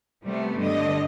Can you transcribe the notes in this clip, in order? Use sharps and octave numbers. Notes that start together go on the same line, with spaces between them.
C3 G3 A3 B3
G2 D3 D#5